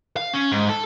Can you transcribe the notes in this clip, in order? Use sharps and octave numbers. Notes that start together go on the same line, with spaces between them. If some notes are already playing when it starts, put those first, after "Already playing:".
F5
C#4
G#2
A4